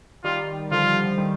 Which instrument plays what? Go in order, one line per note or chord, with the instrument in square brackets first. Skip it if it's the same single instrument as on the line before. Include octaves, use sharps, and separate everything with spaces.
[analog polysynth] D#3 G3 [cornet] F4
[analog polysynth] D3 F3 [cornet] F4
[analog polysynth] D3 F3
D#3 G3